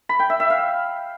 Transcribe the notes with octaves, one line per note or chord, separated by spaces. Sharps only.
B5
G5
E5
E5
F5